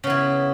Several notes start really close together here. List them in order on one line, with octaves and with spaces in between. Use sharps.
C#3 B3 E4